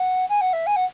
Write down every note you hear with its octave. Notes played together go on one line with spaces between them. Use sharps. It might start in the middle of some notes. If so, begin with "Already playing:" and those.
Already playing: F#5
G#5
F#5
E5
G#5
F#5